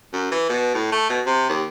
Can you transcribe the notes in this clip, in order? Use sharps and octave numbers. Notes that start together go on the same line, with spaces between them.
F#2
E3
B2
A2
A3
B2
C3
D#2